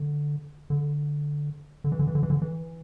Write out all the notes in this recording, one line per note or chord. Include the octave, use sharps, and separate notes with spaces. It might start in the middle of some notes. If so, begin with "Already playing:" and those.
Already playing: D3
D3
D3
E3
D3
E3
D3
E3
D3
E3